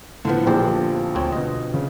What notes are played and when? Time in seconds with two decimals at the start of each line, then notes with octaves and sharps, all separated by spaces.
0.25 A2 D3 F3 B3
0.47 A#1 C4 G4 C5
1.15 D2 C4 C#5
1.33 B2 D#5
1.74 C#3